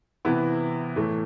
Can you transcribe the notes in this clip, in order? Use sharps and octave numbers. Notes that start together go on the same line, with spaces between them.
C3 E3 B3 E4
A2 E3 A3